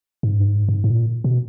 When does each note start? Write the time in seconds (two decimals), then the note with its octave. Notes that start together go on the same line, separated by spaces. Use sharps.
0.23 G#2
0.38 G2
0.46 G#2
0.68 G#2
0.84 G#2
0.91 A#2
1.24 B2